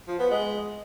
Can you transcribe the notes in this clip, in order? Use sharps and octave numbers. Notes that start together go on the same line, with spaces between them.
F3
B3
G#3